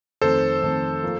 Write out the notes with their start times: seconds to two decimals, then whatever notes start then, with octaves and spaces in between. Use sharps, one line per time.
0.22 F2 D#3 A3 A4 C5
0.62 F2 D#3 A3
1.03 F3 A#3